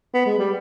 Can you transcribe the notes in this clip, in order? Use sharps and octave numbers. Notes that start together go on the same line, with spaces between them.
B3
G#3
G3